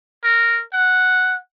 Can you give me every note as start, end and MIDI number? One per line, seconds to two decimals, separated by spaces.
0.24 0.61 70
0.73 1.37 78